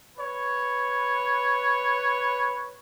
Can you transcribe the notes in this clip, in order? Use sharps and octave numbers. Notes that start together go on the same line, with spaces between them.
B4 C#5